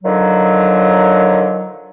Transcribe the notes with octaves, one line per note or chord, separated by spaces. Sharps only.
D3 D#3 F3 F#3